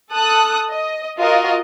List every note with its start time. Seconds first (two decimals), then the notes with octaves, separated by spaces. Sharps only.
0.11 A4 A5 D#6 F#6
0.71 D#5
1.19 F4 F#4 A#4 D#5